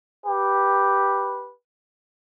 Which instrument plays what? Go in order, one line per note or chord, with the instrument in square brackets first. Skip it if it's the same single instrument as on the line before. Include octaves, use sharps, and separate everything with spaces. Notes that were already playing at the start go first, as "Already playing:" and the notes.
[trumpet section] G4 B4